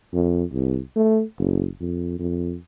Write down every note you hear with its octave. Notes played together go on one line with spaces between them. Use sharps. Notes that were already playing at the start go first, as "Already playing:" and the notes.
F2
C2
A3
F#1
F2
F2